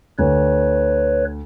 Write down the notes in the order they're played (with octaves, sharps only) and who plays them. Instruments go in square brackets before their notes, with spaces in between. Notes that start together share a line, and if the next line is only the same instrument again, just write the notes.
[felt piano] D2 [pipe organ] B4 C#5